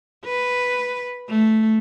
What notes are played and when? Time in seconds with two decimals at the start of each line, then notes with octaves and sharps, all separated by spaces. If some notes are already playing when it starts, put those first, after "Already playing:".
0.25 B4
1.29 A3